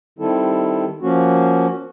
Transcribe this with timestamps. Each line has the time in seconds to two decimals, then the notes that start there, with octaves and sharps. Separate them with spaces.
0.19 D#3 G3 C4 E4 A4
1.02 F3 A#3 C#4 F#4